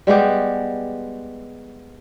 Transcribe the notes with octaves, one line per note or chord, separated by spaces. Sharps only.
G3 G#3 B3 G4